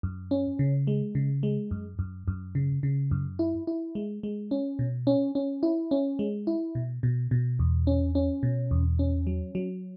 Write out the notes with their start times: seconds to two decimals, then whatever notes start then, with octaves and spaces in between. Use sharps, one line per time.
0.03 F#2
0.31 C#4
0.59 C#3
0.87 G#3
1.15 C#3
1.43 G#3
1.71 F#2
1.99 F#2
2.28 F#2
2.55 C#3
2.83 C#3
3.11 F#2
3.39 E4
3.67 E4
3.95 G#3
4.23 G#3
4.51 C#4
4.79 B2
5.07 C#4
5.35 C#4
5.63 E4
5.91 C#4
6.19 G#3
6.47 E4
6.75 B2
7.03 B2
7.31 B2
7.59 E2
7.87 C#4
8.15 C#4
8.43 B2
8.71 E2
8.99 C#4
9.27 F#3
9.55 F#3